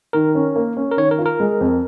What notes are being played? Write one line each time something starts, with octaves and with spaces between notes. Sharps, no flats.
D#3 A#4
C#4
A#3
C#4
A#4
D#3 C#5
A#4
F4
A#4
G#3
F2